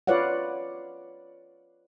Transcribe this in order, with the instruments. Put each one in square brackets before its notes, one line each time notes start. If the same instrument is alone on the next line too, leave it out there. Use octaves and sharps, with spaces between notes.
[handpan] F4 B4 C#5 D5 F5 F#5